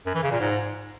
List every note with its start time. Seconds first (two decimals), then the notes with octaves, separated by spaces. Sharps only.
0.06 F#2
0.15 E3
0.23 C#3
0.32 A#2
0.40 G#2